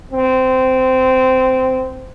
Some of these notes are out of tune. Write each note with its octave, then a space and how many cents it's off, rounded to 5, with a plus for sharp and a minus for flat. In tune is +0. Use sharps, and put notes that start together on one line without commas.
C4 -15